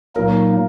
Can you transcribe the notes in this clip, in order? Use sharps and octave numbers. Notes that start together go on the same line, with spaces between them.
A#2 F#3 A#3 D#4 A#4